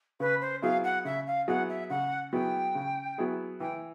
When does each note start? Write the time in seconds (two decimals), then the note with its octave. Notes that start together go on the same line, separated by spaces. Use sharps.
0.20 C#3 B4
0.41 C5
0.62 F#3 B3 E4 G#4 F5
0.84 F#5
1.05 C#3 E5
1.27 F5
1.48 F#3 B3 E4 G#4 F#5
1.69 E5
1.90 C#3 F#5
2.33 F#3 B3 E4 G#4 G5
2.75 C#3
3.18 F#3 B3 E4 G#4
3.60 E3 G5